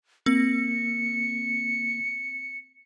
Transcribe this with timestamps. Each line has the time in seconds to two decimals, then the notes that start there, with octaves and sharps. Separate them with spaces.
0.26 A#3 C4 A#6 C#7